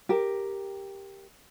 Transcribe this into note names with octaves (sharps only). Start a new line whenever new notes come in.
G4 A#4